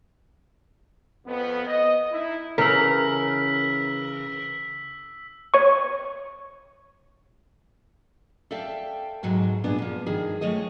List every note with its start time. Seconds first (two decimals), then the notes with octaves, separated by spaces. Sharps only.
1.27 F2 B3
1.68 D#5
2.12 D#4 E4
2.58 C#3 E3 A#4 E6 B6
5.54 C#5 C#6
8.51 A4 D5 E5 F5 G5 A5
9.23 G#2 B2 F#3 G#3
9.64 G2 A#2 B3 D4 G#4 G#5
9.78 A#2 F3
10.06 D2 G2 D#3 G#4
10.41 F3 G#3 A3 C#5 D#5